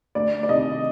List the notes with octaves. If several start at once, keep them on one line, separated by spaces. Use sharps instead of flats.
D2 D5
D5
C3 D#3 D#5